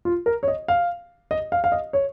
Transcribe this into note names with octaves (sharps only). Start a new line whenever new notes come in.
F4
A#4
C#5
D#5
F5
D#5
F5
F5
D#5
C#5